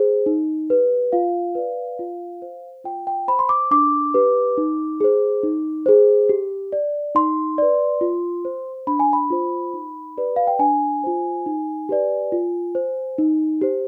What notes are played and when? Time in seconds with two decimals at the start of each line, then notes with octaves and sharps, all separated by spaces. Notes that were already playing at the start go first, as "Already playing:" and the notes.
Already playing: G#4 C5
0.26 D#4
0.70 G4 B4
1.12 F4 F5
1.55 B4 D5
1.99 F4
2.42 C5
2.84 F4 G5
3.07 G5
3.28 C5 B5
3.39 C6
3.49 D6
3.71 D4 D6
4.14 G4 B4
4.58 D#4
5.01 G#4 C5
5.43 D#4
5.86 G#4 C5
6.29 G4
6.72 D5
7.15 D#4 C6
7.58 B4 D5
8.01 F4
8.45 C5
8.87 D4 B5
8.99 G#5
9.13 B5
9.30 F4 C5
9.74 D#4
10.17 G4 B4 D5
10.36 F5
10.47 G5
10.59 D4 G#5
11.04 F4 C5
11.46 D#4
11.89 G4 B4 D5
12.32 F4
12.75 C5
13.18 D#4
13.62 G4 C5